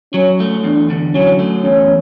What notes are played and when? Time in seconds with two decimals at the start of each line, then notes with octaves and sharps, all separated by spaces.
0.14 F#3 C#4
0.40 A3
0.64 E2 D4
0.90 D3
1.14 F#3 C#4
1.39 A3
1.64 E2 C#4